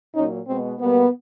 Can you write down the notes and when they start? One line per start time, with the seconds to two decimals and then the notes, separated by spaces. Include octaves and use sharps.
0.15 A#2 F#3 A#3 C#4 D#4
0.48 B2 G#3 B3 C4
0.80 B2 G3 A#3 B3